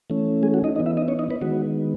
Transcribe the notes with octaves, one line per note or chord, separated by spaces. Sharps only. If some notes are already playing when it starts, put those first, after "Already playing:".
E3 A3 C#4
G#3 G#4
F#4
D#4 D#5
E3 B3 D#4 D#5
E4 E5
D#4 D#5
C#4 C#5
D#4 D#5
B3 B4
D#3 G#3 B3 F#4